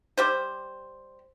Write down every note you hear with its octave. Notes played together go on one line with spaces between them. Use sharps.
G3 G4 C5